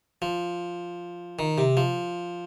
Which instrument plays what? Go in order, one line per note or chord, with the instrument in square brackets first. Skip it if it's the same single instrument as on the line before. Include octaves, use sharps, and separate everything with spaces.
[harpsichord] F3
D#3
C3
F3